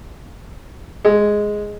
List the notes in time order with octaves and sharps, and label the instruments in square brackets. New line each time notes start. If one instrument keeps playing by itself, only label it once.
[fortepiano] G#3